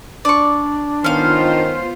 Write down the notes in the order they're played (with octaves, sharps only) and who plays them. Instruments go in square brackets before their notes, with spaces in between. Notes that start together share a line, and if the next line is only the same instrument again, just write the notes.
[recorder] D4 [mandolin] D5 C#6
[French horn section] D#3 [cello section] B3 F4 C5 [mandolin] C#4 F5